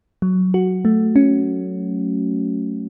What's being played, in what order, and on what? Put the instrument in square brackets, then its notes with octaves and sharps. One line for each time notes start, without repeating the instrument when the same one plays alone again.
[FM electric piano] F#3
F#4
A3
C#4